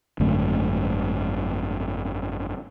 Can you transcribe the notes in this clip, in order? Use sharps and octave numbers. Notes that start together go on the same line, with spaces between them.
G#1 F#2 D3 A3